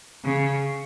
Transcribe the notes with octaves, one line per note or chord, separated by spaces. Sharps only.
C#3